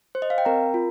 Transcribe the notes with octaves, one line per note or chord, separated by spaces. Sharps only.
C5
D#5
F5
G5
C4 A#4 A#5
F4